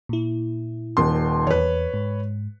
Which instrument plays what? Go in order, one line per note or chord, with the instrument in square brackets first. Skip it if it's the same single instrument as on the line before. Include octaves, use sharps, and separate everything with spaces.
[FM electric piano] A#2 E4
[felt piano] D#1 D#2 C6
[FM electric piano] E2 [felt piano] B4 C#5
[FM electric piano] G#2